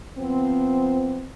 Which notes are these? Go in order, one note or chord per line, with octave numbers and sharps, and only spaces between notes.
F3 B3 C4